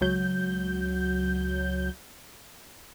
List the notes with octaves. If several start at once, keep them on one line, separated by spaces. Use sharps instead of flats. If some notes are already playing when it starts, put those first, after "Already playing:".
C#2 F#3 G6